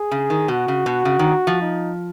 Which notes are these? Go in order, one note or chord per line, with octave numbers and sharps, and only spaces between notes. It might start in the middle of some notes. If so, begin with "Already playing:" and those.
Already playing: G#4
C#3
D#3
B2 F#4
C#3
B2
C#3
D#3
F3
D#4